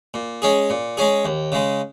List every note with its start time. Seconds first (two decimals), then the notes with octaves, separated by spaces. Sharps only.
0.14 A#2
0.42 G#3 C#4 G#4
0.70 A#2
0.97 G#3 C#4 G#4
1.25 D#2
1.52 C#3 G#3